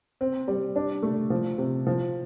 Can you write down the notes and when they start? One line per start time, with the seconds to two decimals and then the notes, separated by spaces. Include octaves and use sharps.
0.21 C4
0.48 G3
0.76 D4
1.03 A3
1.30 F3
1.58 C3
1.87 F3